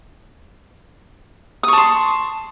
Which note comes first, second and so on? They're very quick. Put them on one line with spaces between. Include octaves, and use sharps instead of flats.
D#6 C#6 A5 C6